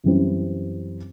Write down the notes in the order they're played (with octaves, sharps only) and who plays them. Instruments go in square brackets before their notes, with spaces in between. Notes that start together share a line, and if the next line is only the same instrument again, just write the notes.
[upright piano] F#2 E3 G3 C4